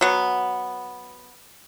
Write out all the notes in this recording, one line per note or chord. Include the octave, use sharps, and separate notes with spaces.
F#3 B3